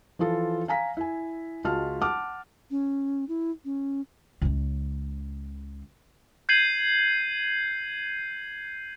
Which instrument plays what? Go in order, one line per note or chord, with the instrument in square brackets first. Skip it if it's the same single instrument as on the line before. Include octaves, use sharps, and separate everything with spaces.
[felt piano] E3 F3 F4 A4
F5 G#5 A#5 B6
E4 G#5
C#2 G#3 F4 F#4 A5 F6
F#5 A5 D6 F6
[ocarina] C#4
E4
C#4
[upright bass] C#2 C#3
[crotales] G6 G#6 C7 D#7 F#7